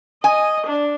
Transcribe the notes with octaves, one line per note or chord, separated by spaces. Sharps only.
D#5 G#5
D4